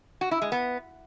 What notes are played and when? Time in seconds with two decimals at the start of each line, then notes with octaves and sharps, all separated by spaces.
0.21 F#4
0.31 E4
0.42 G#3
0.52 B3